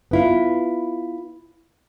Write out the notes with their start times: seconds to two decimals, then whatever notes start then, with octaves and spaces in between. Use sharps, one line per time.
0.11 B3 E4 F4